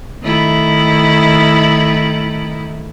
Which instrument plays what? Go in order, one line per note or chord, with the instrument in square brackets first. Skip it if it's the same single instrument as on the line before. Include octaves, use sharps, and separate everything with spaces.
[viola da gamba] D#3 A3 E4